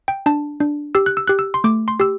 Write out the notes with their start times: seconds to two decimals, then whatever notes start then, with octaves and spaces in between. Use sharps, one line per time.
0.08 G5
0.26 D4 A5
0.60 D4
0.95 G4 E6
1.06 F#6
1.17 E6
1.28 G4 F#6
1.39 E6
1.54 C6
1.64 A3 D6
1.88 C6
2.00 G4 E6